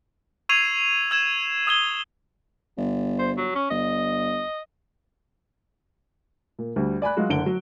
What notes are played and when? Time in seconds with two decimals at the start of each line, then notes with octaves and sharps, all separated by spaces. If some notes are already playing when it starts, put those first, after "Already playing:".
0.49 C#6 E6 G#6 C7 D#7 F7
1.11 E6 G#6 E7
1.67 D#6 E6 G#6 G7
2.77 G1
3.19 C5
3.37 F#3
3.55 C#4
3.70 G1 D#5
6.59 A#2
6.76 D2 G3
7.02 D5 G#5 B5 F#6
7.17 F#3 G#3 F4 F#4
7.29 F#1 D3 F#5 D7 G7
7.46 F#3